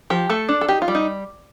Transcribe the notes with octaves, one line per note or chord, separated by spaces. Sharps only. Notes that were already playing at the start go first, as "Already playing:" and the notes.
F3 G4
A3 A4
D4
A4
D#4 G4
F4
G3
D#4